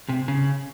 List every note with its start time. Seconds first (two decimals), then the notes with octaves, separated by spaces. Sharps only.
0.09 C3
0.28 C#3